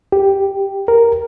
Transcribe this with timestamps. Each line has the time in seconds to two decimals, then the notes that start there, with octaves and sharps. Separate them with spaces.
0.12 G4
0.88 A#4